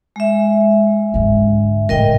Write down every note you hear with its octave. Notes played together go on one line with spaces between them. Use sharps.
G#3 E5
G#2 D3
A2 D3 A#4 D#5 G5